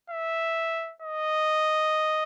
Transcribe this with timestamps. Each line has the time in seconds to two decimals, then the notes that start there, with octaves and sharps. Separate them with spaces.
0.10 E5
1.02 D#5